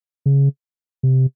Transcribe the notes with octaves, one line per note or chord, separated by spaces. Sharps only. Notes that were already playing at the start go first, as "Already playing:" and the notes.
C#3
C3